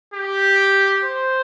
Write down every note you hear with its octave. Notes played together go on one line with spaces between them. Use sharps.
G4
C5